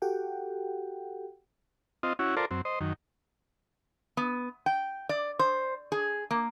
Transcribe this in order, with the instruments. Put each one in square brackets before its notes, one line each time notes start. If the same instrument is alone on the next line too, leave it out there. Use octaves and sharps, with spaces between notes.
[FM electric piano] F#4 G4 A4 F#5 G5
[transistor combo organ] C4 F4 D#5
C#4 E4 F#4
F4 A4 A#4 C5 D5
F#2 C4
C5 D#5
F#2 D#3
[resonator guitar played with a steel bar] B3
G5
D5
C5
G#4
A#3